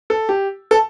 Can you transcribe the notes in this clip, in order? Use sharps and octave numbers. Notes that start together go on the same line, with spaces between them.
A4
G4
A4